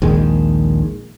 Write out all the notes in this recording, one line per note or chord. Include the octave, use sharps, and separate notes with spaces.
A#1 D#2 D#3 G#3